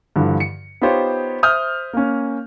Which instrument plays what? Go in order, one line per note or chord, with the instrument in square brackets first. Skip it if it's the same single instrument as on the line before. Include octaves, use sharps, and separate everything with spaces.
[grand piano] G2 D3 E3 F3
C#7
B3 D#4 F4 G4 C5 C#5
C5 E5 D#6 F6 G6
A#3 C#4